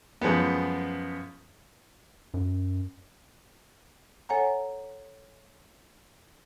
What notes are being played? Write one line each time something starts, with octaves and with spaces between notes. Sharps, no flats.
F#2 F3 G#3 B3
F#2
A4 C#5 F#5 G#5 A#5